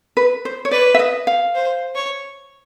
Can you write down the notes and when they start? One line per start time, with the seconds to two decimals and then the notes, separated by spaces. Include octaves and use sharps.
0.17 B4
0.45 C5
0.65 C#5
0.71 B4 D5
0.94 E5
0.99 D#5
1.27 F5
1.54 C5
1.95 C#5